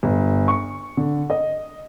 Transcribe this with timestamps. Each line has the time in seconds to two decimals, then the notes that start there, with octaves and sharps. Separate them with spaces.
0.03 G1
0.48 C#6
0.97 D3
1.30 D#5